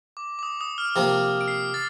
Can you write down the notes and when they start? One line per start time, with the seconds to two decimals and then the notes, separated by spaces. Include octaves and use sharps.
0.17 D6
0.39 D6
0.43 D#6
0.61 D#6
0.78 F6
0.96 C3 F3 A#3
1.41 D7
1.48 C7
1.74 A6